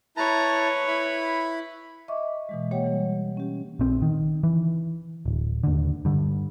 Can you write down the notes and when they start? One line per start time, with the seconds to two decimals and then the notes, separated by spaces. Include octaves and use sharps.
0.17 E4 B4 C#5 A5 A#5
0.88 E4 B5
2.08 D#5 E5 C#6 D6
2.49 B2 E3 G#3
2.71 A#3 G4 C#5 F#5 G5
2.84 E3 G3
3.37 C#4 G4
3.79 A#1 C4
4.02 D#3
4.43 E3
5.26 D1
5.64 D#2 D3
6.05 G2 D3